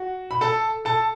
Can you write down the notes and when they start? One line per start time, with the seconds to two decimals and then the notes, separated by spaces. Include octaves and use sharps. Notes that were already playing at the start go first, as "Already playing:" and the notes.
Already playing: F#4 F#5
0.31 B5
0.41 A4 A5
0.85 A4 A5